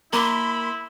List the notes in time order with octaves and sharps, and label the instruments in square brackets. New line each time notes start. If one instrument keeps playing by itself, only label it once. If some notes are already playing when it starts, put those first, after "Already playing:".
[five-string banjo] A#3 [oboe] E4 [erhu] B5 [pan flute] C6